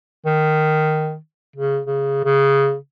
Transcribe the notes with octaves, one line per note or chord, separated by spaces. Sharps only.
D#3
C#3
C#3
C#3